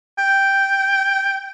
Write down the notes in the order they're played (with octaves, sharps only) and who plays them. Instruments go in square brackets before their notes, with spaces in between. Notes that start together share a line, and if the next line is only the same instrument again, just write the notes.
[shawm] G5